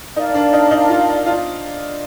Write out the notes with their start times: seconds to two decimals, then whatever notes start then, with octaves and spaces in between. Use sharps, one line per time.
0.16 D#4 A#4 D5 F5 A5
0.34 D4
0.53 D#4
0.71 D#4
0.90 F4
1.26 F4